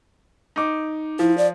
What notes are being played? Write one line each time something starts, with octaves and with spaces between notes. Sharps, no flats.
D#4 D6
F3 E4
D5